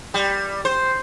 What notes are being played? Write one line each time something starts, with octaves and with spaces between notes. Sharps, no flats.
G3
C5